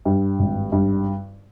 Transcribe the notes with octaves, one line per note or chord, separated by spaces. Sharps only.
G2
G#1
G2